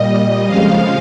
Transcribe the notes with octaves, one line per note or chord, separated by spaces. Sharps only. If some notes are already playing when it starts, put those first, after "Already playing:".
Already playing: A#2 G3 D#5
F2 C#3 F3 G#3 F5